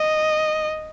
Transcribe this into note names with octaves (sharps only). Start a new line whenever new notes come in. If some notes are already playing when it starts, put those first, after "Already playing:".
Already playing: D#5